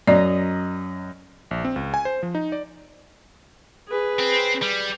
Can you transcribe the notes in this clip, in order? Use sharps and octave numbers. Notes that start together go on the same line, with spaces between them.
F#2 D5 D#5 A#5
A#1
C4
C#2
G#5
C5
F3
D#4
D5
G#4 B4
C4
G3